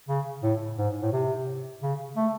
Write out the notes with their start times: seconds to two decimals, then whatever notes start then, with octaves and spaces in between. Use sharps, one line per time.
0.09 C#3
0.43 A2
0.78 G#2
1.02 A2
1.12 C3
1.82 C#3
2.17 A3